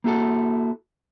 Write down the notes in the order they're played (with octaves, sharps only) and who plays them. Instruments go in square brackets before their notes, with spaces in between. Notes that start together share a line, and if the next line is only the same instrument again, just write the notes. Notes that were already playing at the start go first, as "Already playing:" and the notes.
[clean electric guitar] A#3 E4 F#4 A4